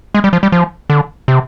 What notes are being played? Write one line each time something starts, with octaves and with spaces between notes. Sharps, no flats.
G#3
G3
F3
G3
F3
D3
C3